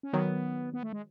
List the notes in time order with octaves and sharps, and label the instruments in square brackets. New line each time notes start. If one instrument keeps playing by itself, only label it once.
[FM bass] C#4
[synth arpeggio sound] D#3 F#3 [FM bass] B3
[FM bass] B3
A3
G#3